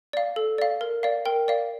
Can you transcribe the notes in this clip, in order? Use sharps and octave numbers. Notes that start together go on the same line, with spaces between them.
D5 F5
A4
D5 F5
A#4
D5 F5
A#4 G5
D5 F5